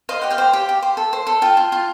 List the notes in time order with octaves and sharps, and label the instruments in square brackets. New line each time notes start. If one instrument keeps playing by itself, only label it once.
[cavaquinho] C5 D#5 F5
G4 F#5
F5 G5
C5
G4
G4
C5
A4
C5
A4
F4 G5 A5
F4
F4